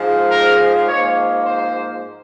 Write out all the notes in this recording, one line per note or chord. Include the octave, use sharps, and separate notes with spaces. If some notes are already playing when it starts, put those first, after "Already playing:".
Already playing: G#2 F3 G#3
A#4
G#2 F3 A#3 C#5
C5